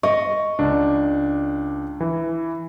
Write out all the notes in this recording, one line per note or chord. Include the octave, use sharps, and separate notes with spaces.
D#5 C#6
C#2 D4
E3